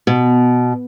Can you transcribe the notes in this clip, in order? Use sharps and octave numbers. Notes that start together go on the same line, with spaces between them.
B2